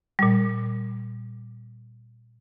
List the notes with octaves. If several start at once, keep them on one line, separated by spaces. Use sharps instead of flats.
A#2 G3